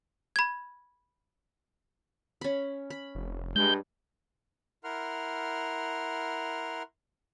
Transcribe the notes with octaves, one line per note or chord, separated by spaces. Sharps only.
B5 G#6
C#4 B5
B5
F1
G2 G#3 G6
E4 A#4 F#5 C6 F6